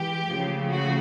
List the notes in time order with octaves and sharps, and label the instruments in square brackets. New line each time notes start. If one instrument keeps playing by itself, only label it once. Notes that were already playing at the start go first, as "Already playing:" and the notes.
Already playing: [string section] E3 G#3 G4
C#3 F3 A3
F#4